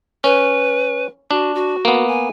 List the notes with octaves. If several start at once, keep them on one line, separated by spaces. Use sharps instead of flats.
C#4 B4
D4 F#4
F#4
A#3 B3
G#5